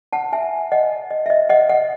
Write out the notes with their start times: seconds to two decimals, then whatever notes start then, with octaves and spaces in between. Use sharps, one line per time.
0.13 F#5 A5
0.32 E5 G#5
0.72 D#5 F#5
1.10 D#5
1.26 E5
1.30 D#5
1.49 D#5 F#5
1.69 D#5 F#5